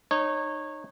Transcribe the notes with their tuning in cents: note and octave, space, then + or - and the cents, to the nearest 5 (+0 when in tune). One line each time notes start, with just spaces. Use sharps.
D#4 -25 C#5 -20